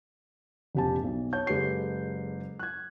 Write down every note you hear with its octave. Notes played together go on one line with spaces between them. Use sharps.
F1 A#1 G4 G#5 A5
B1
C#5 A5 G6
F#1 G#3 G4 A4 B4 C7
F#6 G#6